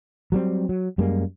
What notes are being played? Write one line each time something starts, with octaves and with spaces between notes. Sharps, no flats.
F#3 G3 C4
F#3
F#2 G3 G#3 A#3